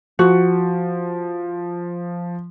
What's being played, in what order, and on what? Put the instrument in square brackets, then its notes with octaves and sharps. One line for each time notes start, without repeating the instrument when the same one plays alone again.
[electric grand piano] F3 [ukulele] F#4